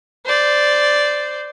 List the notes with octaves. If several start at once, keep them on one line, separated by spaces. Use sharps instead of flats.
C5 D5